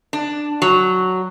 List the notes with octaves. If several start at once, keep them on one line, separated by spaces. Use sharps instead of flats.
D4
F#3